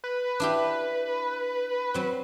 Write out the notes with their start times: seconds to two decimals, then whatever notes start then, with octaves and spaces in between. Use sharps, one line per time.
0.04 B4
0.40 D4 E4 G4
1.94 F#3 C4